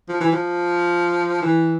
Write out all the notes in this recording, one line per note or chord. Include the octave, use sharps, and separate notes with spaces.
F3
E3
F3
E3